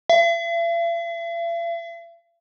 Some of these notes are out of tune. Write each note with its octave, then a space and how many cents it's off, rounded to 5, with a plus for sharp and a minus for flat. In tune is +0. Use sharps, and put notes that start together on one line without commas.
E5 +45